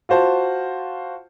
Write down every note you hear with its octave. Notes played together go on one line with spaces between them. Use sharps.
F4 F#4 C5 A5